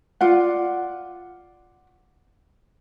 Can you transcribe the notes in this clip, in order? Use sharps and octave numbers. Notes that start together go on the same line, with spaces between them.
F4 D5 F#5